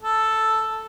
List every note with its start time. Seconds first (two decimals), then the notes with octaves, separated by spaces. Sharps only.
0.02 A4